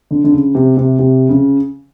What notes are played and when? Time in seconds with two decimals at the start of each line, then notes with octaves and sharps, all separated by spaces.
0.11 D3
0.24 D3
0.32 C#3
0.55 C3
0.77 C3
0.99 C3
1.29 C#3